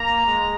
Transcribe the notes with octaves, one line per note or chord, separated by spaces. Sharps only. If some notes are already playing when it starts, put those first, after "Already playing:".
Already playing: A#3 A#5
G#3